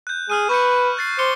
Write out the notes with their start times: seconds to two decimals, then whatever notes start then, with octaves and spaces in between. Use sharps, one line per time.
0.07 F#6 G6
0.30 G#4 D#6 F6 D#7
0.49 B4 C#6 G6 C#7
0.97 F#6 A6 C7
1.19 C5 D6 C#7 G7